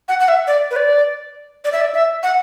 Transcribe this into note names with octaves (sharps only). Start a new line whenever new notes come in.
F#5
F#5
E5
D5
B4
D5
D5
E5
D5
E5
F#5